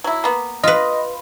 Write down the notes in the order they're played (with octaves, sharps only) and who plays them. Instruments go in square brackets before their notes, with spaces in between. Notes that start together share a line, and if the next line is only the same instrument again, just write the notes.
[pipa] F#3 E4
A#3 B3
[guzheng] F4 B4 [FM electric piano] D#5